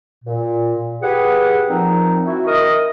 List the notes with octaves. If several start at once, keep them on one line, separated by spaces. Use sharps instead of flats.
A#2
G4 G#4 B4 F#5
A#2 F3 C4 D#4
E4 F#4
D#3 A#4 D#5 D#6